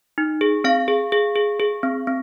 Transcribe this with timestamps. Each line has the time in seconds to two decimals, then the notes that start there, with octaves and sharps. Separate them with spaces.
0.18 D#4
0.41 G#4
0.64 C4 F5
0.88 G#4
1.12 G#4
1.35 G#4
1.60 G#4
1.83 C4
2.07 C4